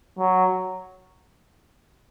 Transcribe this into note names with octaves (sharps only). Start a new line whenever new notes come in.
F#3